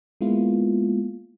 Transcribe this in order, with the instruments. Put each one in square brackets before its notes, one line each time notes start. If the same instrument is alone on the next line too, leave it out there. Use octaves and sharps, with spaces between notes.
[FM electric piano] G#3 A#3 B3 E4 F4